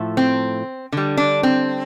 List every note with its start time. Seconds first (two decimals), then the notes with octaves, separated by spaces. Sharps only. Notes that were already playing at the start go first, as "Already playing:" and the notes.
Already playing: A2 F3 A3
0.17 C4
0.92 D3 G3
1.17 D4
1.43 C4